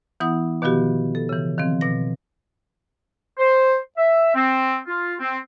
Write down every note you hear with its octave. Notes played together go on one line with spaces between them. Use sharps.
E3 B3 E4 F#5 D#6
B2 D#3 F3 B3 F#4 G4
A4
C#3 E3
D#3 F3 C4
B2 A#6
C5
E5
C4
F4
C4